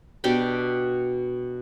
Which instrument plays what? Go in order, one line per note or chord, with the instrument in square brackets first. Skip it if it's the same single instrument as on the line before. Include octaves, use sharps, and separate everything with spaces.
[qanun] B2 D4 G4 G5